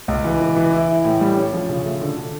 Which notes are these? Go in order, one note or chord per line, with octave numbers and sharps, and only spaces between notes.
C#2
E3
E3
E3
E4
E4
A2
G3
C#4
F3
C#3
A3
D3
D3